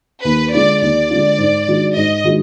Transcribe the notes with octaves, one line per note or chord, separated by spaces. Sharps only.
D#2 B4
D3 G#3 D4 F4 D5
D#2 D5
D3 G#3 D4 F4
G#2
D#3 G#3 D4 F#4
G#2 D#5
D#3 G#3 D4 F#4